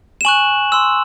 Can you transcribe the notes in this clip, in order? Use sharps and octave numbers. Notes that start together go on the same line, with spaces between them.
E7
G#5 C#6 F#6 F#7
C6 E6